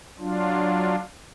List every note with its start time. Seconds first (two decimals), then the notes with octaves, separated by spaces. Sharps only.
0.19 F#3 D4 F4